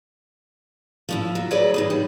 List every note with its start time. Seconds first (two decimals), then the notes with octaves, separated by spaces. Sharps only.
1.09 F3 C#4 E4
1.35 F#3
1.51 D2 F#3 G#4 B4 C#5 D5
1.74 E3 D#4 G#4
1.90 G3